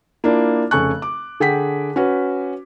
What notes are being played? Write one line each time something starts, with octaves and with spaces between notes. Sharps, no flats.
A#3 D4 E4 F4
F1 C#3 A4 G#5 C#6 F#6
D6
D3 G#4 F#5 G5 B6
C#4 F#4 B4